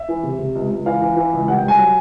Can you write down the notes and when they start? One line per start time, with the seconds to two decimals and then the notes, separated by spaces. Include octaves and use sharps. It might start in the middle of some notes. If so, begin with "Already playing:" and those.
Already playing: E5
0.09 E3
0.23 C3
0.39 C3
0.55 C#2
0.70 C#2
0.86 E3 F5
1.01 E3
1.16 E3
1.33 C#2
1.47 C2 F#5
1.58 G5
1.63 C2
1.68 G#5
1.78 F#3